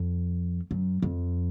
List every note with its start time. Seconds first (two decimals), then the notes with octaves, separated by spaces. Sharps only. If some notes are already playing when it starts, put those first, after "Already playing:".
Already playing: F2
0.71 F#2
1.02 F2